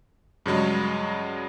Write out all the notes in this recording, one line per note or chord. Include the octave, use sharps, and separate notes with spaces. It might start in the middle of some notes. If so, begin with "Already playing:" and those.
G2 C#3 F#3 G#3